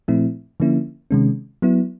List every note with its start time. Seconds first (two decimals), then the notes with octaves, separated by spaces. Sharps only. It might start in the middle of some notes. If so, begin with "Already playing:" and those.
0.08 A#2 F3 A3 C4 E4
0.60 D3 F3 A#3 C#4 E4
1.11 C3 D#3 G#3 C#4
1.62 F#3 B3 E4